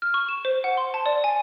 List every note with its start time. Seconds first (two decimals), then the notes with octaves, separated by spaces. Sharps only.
0.02 F6
0.14 C#6
0.28 E7
0.45 C5
0.64 F#5
0.77 C6
0.94 A5
1.06 D5
1.24 G#5